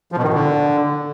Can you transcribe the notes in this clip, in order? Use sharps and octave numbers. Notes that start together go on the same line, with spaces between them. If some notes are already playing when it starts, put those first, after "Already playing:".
F3
B2
D#3
A2
D3